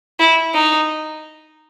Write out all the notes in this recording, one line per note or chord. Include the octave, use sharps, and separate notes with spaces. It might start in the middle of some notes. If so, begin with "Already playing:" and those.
E4
D#4